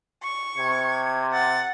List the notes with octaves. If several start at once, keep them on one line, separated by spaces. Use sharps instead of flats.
C#6
C3 G#6
F#5 A6